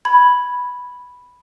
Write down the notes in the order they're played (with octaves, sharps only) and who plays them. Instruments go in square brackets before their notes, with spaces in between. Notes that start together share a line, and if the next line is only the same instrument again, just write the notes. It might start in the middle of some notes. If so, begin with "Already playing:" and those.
[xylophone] B5 G#6